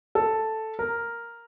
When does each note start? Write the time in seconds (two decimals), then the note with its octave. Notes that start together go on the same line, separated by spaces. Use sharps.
0.15 A4
0.79 A#4